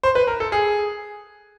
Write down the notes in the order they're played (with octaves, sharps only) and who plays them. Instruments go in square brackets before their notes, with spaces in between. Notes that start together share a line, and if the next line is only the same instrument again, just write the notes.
[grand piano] C5
B4
A#4
A4
G#4